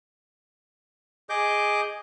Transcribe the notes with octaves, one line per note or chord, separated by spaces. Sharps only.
G#4 D#5 D6 G6